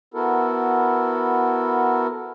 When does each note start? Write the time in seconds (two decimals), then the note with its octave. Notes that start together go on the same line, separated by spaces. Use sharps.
0.14 B3 E4 F#4 A4 A#4